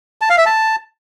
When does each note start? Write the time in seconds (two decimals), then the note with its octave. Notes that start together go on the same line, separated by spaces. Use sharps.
0.21 A5
0.30 F5
0.38 E5
0.46 A5